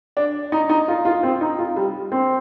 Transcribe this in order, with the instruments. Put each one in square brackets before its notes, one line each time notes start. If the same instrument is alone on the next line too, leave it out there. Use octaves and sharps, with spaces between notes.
[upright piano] D4
D#4
D#4
F4
F4
C4
D#4
F4
G3
C4